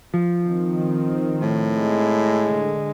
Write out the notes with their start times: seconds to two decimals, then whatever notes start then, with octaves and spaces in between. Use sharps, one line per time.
0.14 F3
0.43 D#3 C4
1.42 A2
1.79 G#3
2.48 D3